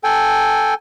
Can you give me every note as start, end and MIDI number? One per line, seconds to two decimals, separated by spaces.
0.04 0.74 69
0.04 0.74 79
0.04 0.74 80